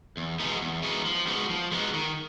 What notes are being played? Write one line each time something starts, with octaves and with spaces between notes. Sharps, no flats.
E2
B2 G#3 B3 D#4
E2
B2 G#3 B3 D#4
F3
G#3 B3 D#4 F#4
F3
G#3 B3 D#4 F#4
D#3